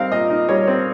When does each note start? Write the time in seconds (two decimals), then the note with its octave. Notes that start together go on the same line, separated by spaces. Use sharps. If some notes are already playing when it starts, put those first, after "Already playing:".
Already playing: G3 C4 D#4 A#4 F5
0.12 A#2 D#5
0.30 D#4
0.49 G3 C#5
0.68 C4